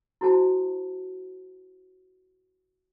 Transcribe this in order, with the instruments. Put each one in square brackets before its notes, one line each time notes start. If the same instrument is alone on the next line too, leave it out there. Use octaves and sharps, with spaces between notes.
[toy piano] E4 F#4 C5 A5